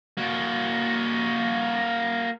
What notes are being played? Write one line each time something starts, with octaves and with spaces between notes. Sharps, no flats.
A#3 F#4